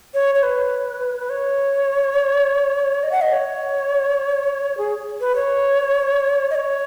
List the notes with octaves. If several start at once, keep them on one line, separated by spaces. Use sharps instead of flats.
C#5
C#5
B4
B4
C#5
D#5
F#5
D#5
C#5
G#4
B4
C#5
D#5
C#5